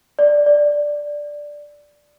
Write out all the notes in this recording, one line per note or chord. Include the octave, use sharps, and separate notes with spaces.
D5
D5